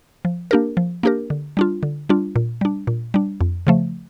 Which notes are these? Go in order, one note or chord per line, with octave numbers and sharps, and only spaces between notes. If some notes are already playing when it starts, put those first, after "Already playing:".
F3
A#3 D4 G4 A#4
F3
A#3 D4 G4 A#4
D3
G3 D4 F4
D3
G3 D4 F4
A#2
G3 D4
A#2
G3 D4
F2
C#3 F3 A3